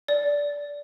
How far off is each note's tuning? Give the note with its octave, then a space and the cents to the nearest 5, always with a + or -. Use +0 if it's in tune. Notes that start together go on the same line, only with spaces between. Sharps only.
D5 -15